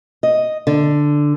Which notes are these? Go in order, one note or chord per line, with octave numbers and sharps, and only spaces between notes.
D#5
D3